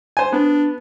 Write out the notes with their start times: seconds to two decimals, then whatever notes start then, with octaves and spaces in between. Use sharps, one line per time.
0.17 C5 G#5
0.32 B3 D4